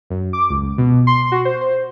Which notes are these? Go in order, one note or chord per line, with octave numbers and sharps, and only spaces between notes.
F#2
D6
C#2
B2
C6
F#4
C5
C5